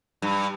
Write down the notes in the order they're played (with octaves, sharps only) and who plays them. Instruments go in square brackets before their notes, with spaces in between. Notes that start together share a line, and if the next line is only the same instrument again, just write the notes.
[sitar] G2